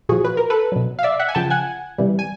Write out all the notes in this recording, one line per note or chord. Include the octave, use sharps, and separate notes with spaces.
A#2 F3 F#4 G#4
B4
A#4
A4 B4
B2 F#3
F5
D5 E5
E5 F#5
G#5
C#3 F3 G5 A5
F#5 G#5
C3 E3 G3
G#5